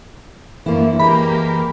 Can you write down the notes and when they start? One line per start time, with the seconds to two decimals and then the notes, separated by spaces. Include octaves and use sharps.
0.66 F#2 D3 E3 F3 A#3 E4
1.00 G#3 A#3 G4 A#4 B5